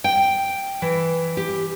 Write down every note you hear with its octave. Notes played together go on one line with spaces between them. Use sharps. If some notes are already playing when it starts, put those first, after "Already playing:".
G5
E3
G4